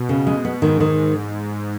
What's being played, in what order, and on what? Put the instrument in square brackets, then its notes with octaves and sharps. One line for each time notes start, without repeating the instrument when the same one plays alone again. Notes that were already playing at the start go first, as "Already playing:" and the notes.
Already playing: [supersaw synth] B2
[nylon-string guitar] C#3
G#3
B3
[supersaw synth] G#2 [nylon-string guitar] D#3
[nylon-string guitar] D#3